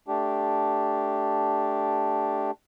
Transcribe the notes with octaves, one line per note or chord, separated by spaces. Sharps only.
A3 D4 G4